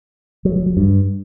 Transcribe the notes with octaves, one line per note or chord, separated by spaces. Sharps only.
F#3
F#3
F#3
G2